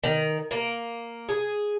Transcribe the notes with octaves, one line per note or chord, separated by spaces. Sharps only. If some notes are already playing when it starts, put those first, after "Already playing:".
D#3
A#3
G#4